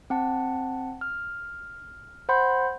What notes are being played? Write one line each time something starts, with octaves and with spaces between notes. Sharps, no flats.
C4 F#5 A5
F6
C5 F#5 B5 C6 G6